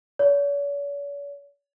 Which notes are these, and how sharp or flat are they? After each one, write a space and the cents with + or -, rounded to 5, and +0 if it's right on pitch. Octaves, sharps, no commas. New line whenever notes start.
C#5 +45